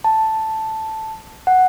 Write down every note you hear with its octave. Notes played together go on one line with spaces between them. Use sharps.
A5
F#5